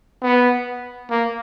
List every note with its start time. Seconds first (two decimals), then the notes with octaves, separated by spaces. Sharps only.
0.22 B3
1.10 A#3